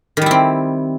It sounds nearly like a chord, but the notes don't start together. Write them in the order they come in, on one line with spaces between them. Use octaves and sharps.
D#3 G3 E4 C4